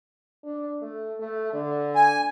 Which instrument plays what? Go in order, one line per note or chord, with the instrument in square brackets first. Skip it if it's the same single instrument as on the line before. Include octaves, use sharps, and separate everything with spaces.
[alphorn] D4
A3
A3
D3
[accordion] G#5